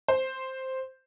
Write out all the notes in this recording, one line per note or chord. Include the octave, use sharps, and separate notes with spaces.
C5